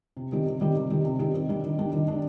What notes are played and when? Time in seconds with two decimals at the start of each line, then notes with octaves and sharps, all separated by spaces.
0.17 C3
0.32 D#3 G3 C4 G4
0.46 C3
0.61 D#3 G3 C4 G4
0.76 C3
0.90 D#3 G3 C4 G4
1.05 C3
1.19 D#3 G3 C4 G4
1.34 D#3
1.49 G3 D4
1.64 D#3
1.79 G3 D4
1.93 D#3
2.08 G3 D4